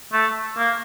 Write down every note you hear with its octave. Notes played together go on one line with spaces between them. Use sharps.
A3
A#3